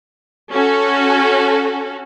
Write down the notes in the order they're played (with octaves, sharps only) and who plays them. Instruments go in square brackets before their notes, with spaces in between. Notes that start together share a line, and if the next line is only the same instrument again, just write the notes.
[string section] C#4 F#4 A4